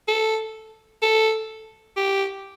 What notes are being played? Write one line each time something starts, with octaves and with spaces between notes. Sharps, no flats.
A4
A4
G4